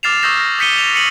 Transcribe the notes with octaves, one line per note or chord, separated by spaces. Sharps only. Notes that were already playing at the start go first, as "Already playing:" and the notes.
D6 F6 A6 C7 E7 F7
C#6 D#6 E6 G6 A#6 E7
F6 A#6
D#6 G6 B6 C#7 D#7 G7
E7 F7
B6 C#7 D#7 F#7